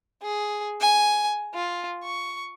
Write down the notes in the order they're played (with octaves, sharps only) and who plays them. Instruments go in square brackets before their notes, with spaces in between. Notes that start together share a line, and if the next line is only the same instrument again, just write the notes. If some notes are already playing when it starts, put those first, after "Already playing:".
[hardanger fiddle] G#4
G#5
F4
C#6